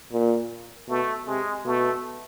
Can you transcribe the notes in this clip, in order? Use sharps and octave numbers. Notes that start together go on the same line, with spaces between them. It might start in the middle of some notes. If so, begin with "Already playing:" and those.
A#2
B2 A3
C3 G#3
B2 A3